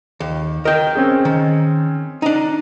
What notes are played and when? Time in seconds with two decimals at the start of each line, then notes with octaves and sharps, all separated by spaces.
0.20 D#2
0.65 A#4 D#5 G5
0.95 C4 C#4 G#4
1.25 D#3
2.22 D4 D#4